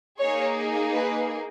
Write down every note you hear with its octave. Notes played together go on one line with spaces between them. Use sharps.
A#3 D#4 G#4 C#5
B4